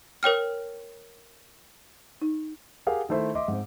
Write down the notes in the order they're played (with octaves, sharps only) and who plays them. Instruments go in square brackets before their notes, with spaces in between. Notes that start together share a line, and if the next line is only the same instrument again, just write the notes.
[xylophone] A#4 C#5 G5 F6
[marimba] D#4
[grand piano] G4 G#4 A#4 F5 F#5
D#3 A3 E4 C5 E6
D#5 E5 C6 D6
G#2 C4